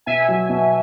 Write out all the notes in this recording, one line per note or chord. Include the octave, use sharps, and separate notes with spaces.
B2 E5 G#5
F#3
B2